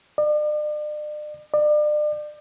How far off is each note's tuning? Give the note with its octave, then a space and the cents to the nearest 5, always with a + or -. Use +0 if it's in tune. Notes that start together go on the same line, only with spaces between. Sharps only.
D5 +40
D5 +35